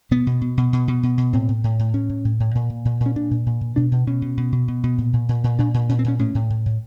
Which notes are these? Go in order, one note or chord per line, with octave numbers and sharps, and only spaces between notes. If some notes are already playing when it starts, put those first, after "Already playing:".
B2 B3
B2
B2
B2
B2
B2
B2
B2
A2 C4
A2
A2
A2
A2 C#4
A2
A2
A2
A#2
A#2
A#2
A#2
C#4
A#2 D4
A#2
A#2
A#2
B2 D4
B2
B2 C#4
B2
B2
B2
B2
B2
A#2
A#2
A#2
A#2
A#2 D4
A#2
A#2 C#4
C4
A#2 C#4
A2 C#4
A2
A2
A2